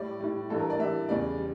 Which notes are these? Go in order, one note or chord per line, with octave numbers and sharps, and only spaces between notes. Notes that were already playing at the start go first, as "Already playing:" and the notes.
Already playing: A2 G3 D5
A2 G3
G2 E3 G3 A4
A#4
D5
G2 E3 G3 E5
E2 C#3 G3 D5
G3